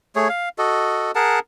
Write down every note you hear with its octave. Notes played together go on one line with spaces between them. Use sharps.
A3 G#4 C#5
F5
F#4 A4 D#5
G#4 A#4 F#5 A5